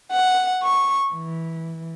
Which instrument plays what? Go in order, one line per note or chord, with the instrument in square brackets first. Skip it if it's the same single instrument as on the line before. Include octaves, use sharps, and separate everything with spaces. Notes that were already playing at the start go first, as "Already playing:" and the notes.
[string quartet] F#5
C#6
E3